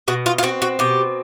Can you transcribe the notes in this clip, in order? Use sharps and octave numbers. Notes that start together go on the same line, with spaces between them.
B2 F#4
F4
F4
C4 F#4
F#4
B2 G4